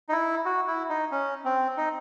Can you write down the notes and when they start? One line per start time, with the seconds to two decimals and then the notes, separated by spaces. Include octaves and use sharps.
0.09 D#4
0.12 E4
0.45 F#4
0.67 E4
0.89 D#4
1.11 C#4
1.45 C4
1.77 D#4